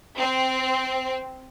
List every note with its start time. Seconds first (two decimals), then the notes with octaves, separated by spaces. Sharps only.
0.17 C4